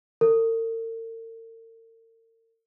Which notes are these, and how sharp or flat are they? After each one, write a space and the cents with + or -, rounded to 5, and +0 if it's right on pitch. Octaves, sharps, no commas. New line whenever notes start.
A#4 -45